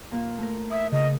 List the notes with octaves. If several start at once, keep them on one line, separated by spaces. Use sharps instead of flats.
A#2 A#3 F4
A3 A#4
E5 D#6
C#3 D#5